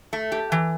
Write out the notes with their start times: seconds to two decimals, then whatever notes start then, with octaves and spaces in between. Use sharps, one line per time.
0.13 A3
0.32 G4
0.52 E3